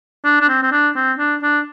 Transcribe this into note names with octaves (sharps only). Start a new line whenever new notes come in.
D4
D4
C4
C4
D4
C4
D4
D4